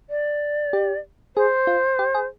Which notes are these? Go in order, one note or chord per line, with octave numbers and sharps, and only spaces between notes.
D5
G4
G#4 C5
F4
G4
G#4